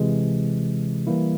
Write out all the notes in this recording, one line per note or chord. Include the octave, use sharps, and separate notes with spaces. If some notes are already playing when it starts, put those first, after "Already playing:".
Already playing: C3 E3 G#3
E3 G3 A#3 E4